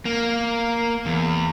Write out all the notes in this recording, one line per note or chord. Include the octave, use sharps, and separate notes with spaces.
A#3
E2